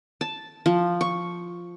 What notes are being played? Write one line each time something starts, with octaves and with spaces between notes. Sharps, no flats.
A5
F3
C#6